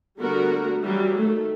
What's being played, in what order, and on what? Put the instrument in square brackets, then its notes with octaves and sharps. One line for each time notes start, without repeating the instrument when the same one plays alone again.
[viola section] D3 G3 A3 B3 F#4 A#4
E3 F#3 G3
D#3 A3